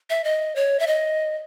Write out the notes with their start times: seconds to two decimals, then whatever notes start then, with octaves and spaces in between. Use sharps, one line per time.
0.10 E5
0.24 D#5
0.56 C#5
0.80 E5
0.87 D#5